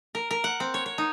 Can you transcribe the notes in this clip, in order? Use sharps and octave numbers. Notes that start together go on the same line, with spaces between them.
A#4
A#4
F#5
C4
C#5
C#5
D#4